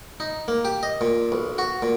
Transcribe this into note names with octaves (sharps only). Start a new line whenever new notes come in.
D#4
A#3
G4
D#5
A#2
B1
F#4
A#2